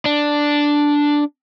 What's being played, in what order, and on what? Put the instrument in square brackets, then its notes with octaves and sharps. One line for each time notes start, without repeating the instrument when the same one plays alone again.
[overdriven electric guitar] D4